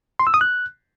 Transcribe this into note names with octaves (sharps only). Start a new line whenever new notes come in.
C6
E6
D#6
F#6